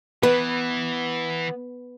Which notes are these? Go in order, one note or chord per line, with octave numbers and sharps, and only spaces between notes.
E3 B3 B4